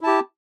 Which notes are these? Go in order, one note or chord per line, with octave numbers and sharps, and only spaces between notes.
E4 G4 A5